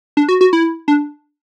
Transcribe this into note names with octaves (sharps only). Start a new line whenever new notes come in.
D4
F#4
F#4
E4
D4